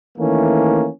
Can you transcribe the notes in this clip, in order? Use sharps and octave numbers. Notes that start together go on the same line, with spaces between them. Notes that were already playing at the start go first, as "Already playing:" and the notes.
D#3 E3 A3 A#3 C#4